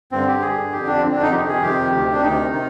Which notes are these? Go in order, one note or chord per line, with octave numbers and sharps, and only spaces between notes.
G2 D3 C4
G4
G2 D3 G#4
F2 D3 G4
D4
F2 D3 C4
D4
D#4
F2 C3 D#3 G4
G#4
F2 C3 D#3 G4
D2 C3 D#3
D4
D2 C3 D#3 D#4
C3 D#3